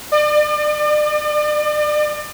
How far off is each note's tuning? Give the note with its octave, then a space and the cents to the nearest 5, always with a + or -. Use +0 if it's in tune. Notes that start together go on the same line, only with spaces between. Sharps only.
D5 +40